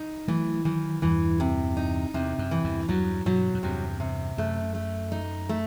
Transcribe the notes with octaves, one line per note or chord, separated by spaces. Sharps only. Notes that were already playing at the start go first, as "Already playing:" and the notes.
Already playing: D#4
E3 F#3 A3
D#3 E3 F#3
E2 G2 E3
C3
D#4
E2 C3
F#2
E3
E2 G2
E2 G2 F#3
G2 B2 F#3
F#2
E2 G2 C3
C3
F#2 A3
A3
D#4
A3